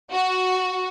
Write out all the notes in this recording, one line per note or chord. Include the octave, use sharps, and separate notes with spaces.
F#4